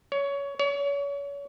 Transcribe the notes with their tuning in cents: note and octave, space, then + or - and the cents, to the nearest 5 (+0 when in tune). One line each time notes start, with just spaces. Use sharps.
C#5 +20
C#5 +35